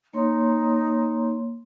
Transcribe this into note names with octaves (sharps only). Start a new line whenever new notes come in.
A#3 D#4 C#5 C6